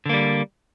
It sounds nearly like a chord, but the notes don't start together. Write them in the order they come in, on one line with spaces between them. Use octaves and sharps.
D3 A#3 G3